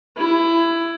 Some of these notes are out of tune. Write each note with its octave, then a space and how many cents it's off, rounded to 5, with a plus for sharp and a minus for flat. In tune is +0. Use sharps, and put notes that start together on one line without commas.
E4 +15